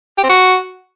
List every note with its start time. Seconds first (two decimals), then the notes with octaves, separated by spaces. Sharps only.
0.18 G4
0.24 C4
0.29 F#4